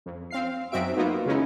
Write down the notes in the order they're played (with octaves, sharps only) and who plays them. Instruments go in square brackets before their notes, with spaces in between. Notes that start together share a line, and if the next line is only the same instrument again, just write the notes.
[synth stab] F2
C4 F5 C7
F#2 C4 D#4 F#4 E5 D7
A#3 B3 D#4 F4 F#4
C#3 G#3 C#4 D#4 E4